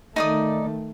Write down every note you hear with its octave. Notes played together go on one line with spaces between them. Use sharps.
D#3 A3 D#4 D5 D#6